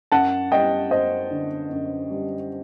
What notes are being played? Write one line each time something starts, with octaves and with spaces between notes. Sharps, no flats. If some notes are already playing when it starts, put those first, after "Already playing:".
F#2 F#5 A5
G3 D#5 G5
F#2 C5 D#5
D3
F#2
G3